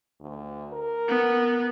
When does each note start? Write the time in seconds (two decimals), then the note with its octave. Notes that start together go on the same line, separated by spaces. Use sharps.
0.21 D2
0.73 A#4
1.08 B3